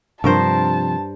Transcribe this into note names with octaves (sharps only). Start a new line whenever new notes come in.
G2 C3 F3 A#4 C5 A5